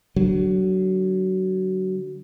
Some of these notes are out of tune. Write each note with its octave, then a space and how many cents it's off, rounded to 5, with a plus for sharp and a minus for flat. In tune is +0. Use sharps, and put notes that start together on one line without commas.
D3 +0 F#3 +20